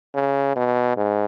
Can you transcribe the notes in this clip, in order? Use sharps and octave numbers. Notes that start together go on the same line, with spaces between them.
C#3
B2
G#2